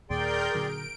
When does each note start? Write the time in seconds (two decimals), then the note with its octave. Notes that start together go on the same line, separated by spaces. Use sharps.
0.10 D#2 A#2 G#4 A#4 D5 G5 C6 G6
0.54 A#2 D3 F#3 D7